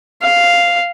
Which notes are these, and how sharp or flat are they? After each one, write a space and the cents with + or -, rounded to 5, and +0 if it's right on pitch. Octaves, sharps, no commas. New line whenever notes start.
F5 -5